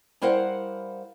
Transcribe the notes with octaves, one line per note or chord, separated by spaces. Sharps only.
G3 E4 A#4 C5 F5 F#5